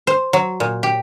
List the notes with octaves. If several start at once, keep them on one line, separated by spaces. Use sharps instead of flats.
C5
F#3
A#2
G4